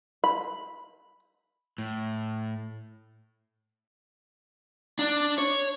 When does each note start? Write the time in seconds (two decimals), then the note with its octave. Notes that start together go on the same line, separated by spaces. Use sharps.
0.24 B5
1.78 A2
4.99 D4
5.38 C#5